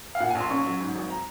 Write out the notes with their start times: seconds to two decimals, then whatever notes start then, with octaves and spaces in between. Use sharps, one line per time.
0.15 F5
0.20 A#2 F#5
0.30 G#5
0.35 A#1
0.40 C6
0.50 C#4 C#6
0.65 F#3
0.80 G#2
0.96 G#1
1.10 A#5